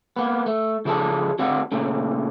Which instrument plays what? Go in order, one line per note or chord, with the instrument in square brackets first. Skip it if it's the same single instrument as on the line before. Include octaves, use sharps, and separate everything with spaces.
[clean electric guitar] A#3 B3
A3
C#3 F3 G#4 A4 A5
D2 C4 F#4 F5 F#5
A#2 C#3 A3